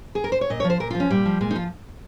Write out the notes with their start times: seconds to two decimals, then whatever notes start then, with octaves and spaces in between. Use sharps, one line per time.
0.15 G#4
0.24 A#4
0.32 C5
0.41 C#5
0.50 A#2 D#5
0.60 C#5
0.64 F3
0.70 C5
0.80 A#2 A#4
0.90 F4
0.95 F3
1.00 C#4
1.10 A#2 G3
1.26 F3
1.41 A#2 G#3
1.51 D#4
1.55 F3 F4